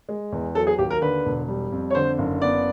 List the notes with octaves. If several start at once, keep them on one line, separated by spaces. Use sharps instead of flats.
G#3
E2
F#3 A4
G#4
D#2 G4
A#4
D3 B4
E1
G3
F2
C#5
D3 C5
F#1
B3 D5